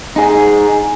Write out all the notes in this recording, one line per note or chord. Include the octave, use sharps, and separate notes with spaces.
D#4 G#4